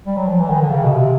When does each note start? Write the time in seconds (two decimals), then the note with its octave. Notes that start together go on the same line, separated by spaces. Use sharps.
0.07 G3
0.17 F#3
0.28 F3
0.39 E3
0.50 D#3
0.62 D3
0.71 C#3
0.84 B2
0.93 C3